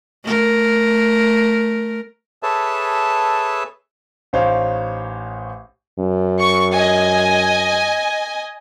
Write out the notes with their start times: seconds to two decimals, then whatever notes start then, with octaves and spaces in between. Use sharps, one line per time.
0.24 A3 A#4
2.43 G#4 A4 B4 C#5 E5 A5
4.33 A1 D#4 C5 C#5 F5
5.99 F#2
6.39 C#6
6.74 D#5 G#5